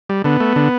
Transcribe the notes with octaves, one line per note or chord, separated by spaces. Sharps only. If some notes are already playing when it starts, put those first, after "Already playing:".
G3
D3 B3
A3
D3